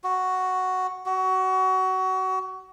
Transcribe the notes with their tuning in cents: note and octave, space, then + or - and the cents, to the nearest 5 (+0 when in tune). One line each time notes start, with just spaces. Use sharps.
F#4 +5
F#4 +25